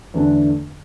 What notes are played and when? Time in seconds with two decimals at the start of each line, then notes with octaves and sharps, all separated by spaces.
0.14 E2 D3 A3 D4